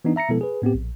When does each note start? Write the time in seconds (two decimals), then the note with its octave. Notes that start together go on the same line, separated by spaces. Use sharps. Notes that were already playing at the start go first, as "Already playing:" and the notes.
0.05 E3 B3 D4 D#4
0.16 E5 A#5 A#6 C#7
0.29 B2 F3 G#3 B3 E4 A4
0.41 G#4 B4
0.62 A2 B3 C4 G4
0.74 A#1